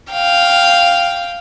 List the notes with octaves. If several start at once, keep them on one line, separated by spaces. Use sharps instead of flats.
F5 G5